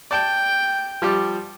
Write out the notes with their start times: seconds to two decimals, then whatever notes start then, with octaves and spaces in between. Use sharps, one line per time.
0.11 D5 G5 A5
1.02 F3 G3 G4